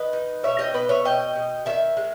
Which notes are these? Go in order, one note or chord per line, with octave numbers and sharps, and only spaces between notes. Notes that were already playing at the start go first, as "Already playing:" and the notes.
Already playing: D#3 B4 D#5
D#4
B2 C#5 E5
D#5 G5
B2 B4 D#5
C#5 E5
B2 D#5 G5
B2
D#3 E5 G#5
G#3